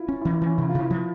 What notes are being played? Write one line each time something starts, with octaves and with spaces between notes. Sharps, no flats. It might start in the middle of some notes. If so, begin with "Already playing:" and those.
Already playing: E4 F4
C#4
E4
E3
E4
E3 C#4
C3 E4
F4
C3
E4
F3